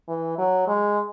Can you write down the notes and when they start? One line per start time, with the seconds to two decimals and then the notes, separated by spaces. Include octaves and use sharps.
0.08 E3
0.39 F#3
0.67 G#3